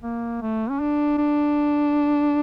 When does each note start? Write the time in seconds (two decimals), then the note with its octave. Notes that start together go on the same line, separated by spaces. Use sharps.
0.03 A#3
0.42 A3
0.70 C#4
0.80 D4
1.18 D4